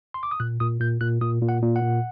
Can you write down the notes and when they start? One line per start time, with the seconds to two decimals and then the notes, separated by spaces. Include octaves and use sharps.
0.14 C6
0.23 D6
0.31 D#6
0.40 A#2 F#6
0.60 A#2 D#6
0.80 A#2 G6
1.01 A#2 F#6
1.21 A#2 D#6
1.42 A#2
1.49 F#5
1.62 A#2
1.76 F#5
1.83 A#2